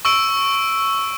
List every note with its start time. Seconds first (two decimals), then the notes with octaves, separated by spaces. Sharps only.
0.05 C#6 E6 D7